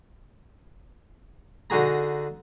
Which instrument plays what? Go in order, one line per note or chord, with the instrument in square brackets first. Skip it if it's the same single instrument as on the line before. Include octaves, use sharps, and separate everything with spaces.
[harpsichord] D3 D#4 F#4 G#4 A#5